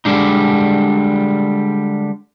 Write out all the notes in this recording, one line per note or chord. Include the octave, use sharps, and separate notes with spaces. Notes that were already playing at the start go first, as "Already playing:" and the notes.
D3 G3 G#3 D4 D#4